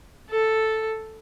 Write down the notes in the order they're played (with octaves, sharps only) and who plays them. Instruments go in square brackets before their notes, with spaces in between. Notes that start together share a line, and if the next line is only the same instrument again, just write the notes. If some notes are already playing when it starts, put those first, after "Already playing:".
[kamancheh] A4